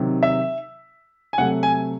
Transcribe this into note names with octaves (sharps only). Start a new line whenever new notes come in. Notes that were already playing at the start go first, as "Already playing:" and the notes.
Already playing: C3 D#3 F#3
E5
G#5
C3 F#3 A3 F#5
G#5